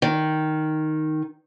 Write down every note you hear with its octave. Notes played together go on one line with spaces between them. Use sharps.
D#3